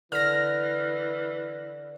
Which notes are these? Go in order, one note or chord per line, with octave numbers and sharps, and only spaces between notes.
D3 E3 F6 A#6